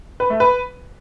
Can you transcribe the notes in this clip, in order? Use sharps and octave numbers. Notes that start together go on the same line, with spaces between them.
B4
A3
B4